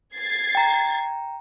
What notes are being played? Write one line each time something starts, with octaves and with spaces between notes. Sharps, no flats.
G#6 A6 C7
G5 A#5